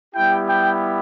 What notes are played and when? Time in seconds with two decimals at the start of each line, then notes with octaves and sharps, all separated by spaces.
0.15 G3 B3 E4 G4 G5
0.49 G5